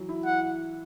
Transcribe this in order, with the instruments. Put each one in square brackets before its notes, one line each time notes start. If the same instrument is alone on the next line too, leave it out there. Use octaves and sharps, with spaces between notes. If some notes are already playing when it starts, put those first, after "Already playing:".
Already playing: [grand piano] E3 F#3
E4
[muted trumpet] F#5